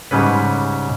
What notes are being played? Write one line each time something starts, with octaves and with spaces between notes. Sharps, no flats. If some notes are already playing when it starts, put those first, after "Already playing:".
G#2 C#3 G3 C#4 B4